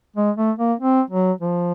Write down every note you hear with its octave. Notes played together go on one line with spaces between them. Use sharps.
G#3
A3
A#3
C4
F#3
F3